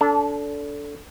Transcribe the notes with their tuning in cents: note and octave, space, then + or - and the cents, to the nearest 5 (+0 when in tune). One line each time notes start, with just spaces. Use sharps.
D4 -30 A4 +0